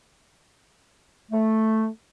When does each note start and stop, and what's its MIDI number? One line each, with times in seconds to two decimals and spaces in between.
1.30 1.87 57